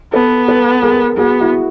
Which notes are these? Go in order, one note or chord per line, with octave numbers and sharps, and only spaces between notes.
B3 A4 B4
A4 B4
G#4 A#4
B3 F#4 G#4
E4 F#4